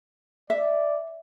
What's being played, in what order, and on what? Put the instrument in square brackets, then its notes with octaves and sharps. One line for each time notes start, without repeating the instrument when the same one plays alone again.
[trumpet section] D5 [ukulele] E5